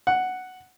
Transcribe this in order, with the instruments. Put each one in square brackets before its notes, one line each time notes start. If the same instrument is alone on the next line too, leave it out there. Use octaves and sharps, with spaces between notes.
[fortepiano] F#5